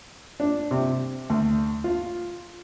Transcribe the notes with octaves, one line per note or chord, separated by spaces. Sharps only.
D4
C3
D2
F4